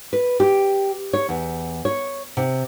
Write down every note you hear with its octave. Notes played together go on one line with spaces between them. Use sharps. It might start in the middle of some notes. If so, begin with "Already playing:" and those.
B4
G4
C#5
E2
C#5
C3